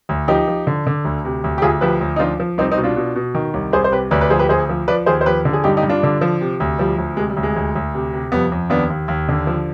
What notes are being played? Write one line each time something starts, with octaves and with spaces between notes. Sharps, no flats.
D2
F3 D#4 G4
F3
D3
D3
D2
C3
D2
G4
D2 F4 G#4
F3 G4 B4
D2
D#4
F3 D4 F4
F3
C2 C4 D#4
C4 D#4
B2
D4 F4
B2
B2
D#3
C2
C2 G#4 C5
C5
C3 G4 B4
D2 B4 D5
B4 D5
F3 G#4 C5
G4 B4
D2 G#4 C5
F3
F3 B4 D5
D#2 G#4 C5
C5
F3 G4 B4
D3
G#4
G2 D#4 G4
D#4 G4
G2
D4 F4
D3
F3
C3
D2
F3 G3
D2
C3 G#3
G3
D2
G#3
D2
D2
C3
C3
F2 G3 B3
F2
D#2 B3 D4
D#2
D#2
D3
F3